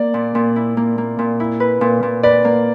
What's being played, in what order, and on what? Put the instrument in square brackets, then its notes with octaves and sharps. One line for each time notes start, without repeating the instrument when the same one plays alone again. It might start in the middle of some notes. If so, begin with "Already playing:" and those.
Already playing: [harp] A#3 [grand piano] D5
[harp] A#2
A#2
E4
A#3
A#3
A#2
E4
B4
A#2
A#2
[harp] B4 [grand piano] D5
[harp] A#3